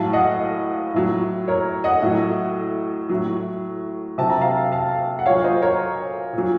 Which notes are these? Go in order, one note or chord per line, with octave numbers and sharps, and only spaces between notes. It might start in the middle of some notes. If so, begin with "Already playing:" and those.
Already playing: A2 F#3 F5 A5
D#5 F#5
A2 F#3
A#4 C#5
D#5 F#5
A2 F#3
A2 F#3
C3 F#3 A5
A#5
F5 A5
F5 A5
F#5
A#2 F#3 C#5 F5
C5 D#5
A#4 C#5
A#2 F#3